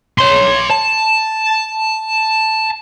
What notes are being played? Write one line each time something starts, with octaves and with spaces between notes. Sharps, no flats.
C#5 C6
A5